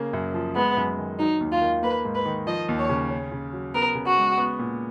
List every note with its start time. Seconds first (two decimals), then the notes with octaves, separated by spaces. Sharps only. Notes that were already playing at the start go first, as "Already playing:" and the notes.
Already playing: C#3 A#3
0.13 F#2
0.34 F3
0.56 G#3 B3
0.77 F#2
0.98 D#3
1.19 F#3 D#4
1.41 D#2
1.52 F4
1.62 D#3
1.83 A#3 B4
2.05 G#2
2.15 B4
2.25 D#3
2.47 F3 D#5
2.69 D#2
2.79 C#5
2.90 C#3
3.11 C#4
3.32 C#3
3.53 F#3
3.74 B3 A#4
3.95 C#3
4.07 F#4
4.17 G#3
4.38 B3
4.59 A#2